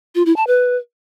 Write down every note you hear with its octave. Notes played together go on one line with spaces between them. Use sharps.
F4
E4
A5
B4